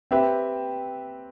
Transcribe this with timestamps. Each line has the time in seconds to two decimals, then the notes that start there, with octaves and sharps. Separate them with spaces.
0.11 C4 G4 B4 E5